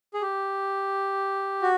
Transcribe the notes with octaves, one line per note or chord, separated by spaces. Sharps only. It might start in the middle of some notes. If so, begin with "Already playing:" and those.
G#4
G4
F#4